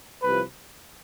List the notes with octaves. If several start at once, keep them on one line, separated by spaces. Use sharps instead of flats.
C2 C3 F3 B4